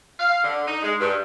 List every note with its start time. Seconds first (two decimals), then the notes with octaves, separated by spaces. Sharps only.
0.19 F5
0.43 D3
0.66 D#4
0.83 G#3
1.00 G2